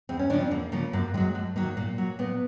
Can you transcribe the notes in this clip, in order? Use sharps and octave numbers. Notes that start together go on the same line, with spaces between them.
E2 C4
C#4
C#3 F3 D4
C4
E2 A#3
C#3 F3 A#3
F#2 A#3
D#3 F#3 G#3
F#2 A3
D#3 F#3 A#3
A#2 A#3
F#3
A#2 B3